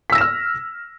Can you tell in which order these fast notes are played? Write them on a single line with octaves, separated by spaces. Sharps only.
B6 E6 A#6 E7 F6